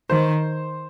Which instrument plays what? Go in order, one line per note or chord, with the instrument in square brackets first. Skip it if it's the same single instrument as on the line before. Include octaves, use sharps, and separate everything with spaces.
[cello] D#3 [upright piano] C5